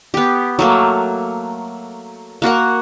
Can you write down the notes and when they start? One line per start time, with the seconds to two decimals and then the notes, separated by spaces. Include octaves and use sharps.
0.14 B3 G4
0.59 F#3 A3 A#3
2.42 A#3 F#4 A#4 F#5